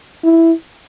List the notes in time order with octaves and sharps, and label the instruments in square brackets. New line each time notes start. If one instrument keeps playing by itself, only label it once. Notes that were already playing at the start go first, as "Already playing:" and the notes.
[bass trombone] E4